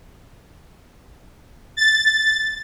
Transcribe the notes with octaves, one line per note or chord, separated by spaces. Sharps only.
A6